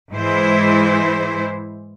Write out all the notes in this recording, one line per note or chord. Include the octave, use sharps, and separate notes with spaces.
G#2 E3 G#3 E4 C5